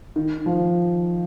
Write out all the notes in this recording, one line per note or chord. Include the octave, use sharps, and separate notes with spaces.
D#3
F3